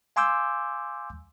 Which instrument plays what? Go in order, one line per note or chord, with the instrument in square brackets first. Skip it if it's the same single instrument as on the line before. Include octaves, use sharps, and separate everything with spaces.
[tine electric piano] F5 G#5 C6 D6 E6 G6